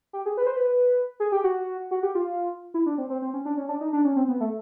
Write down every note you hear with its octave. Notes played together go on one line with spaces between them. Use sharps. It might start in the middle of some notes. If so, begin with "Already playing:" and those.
G4
G#4
B4
C5
B4
G#4
G4
F#4
F#4
G4
F4
E4
D4
C4
C4
C4
C#4
D4
C#4
D4
D#4
D4
C#4
C4
B3
A3